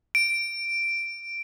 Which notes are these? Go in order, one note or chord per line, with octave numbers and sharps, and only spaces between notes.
D7